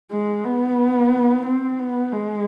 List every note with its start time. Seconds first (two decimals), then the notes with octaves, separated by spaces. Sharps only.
0.11 G#3
0.45 B3
1.45 C4
1.79 B3
2.13 G#3